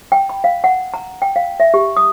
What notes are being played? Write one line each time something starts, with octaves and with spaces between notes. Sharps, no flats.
G5
B5
F5
F#5
A#5
G5
F5
E5
G4
D#6